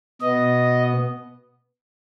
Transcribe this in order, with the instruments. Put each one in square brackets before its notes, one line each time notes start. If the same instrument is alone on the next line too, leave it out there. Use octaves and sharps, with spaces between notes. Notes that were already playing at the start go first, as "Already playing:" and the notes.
[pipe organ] B2 B3 D#5